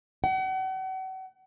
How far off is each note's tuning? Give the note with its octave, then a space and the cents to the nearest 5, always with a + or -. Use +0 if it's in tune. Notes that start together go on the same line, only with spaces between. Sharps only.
F#5 +40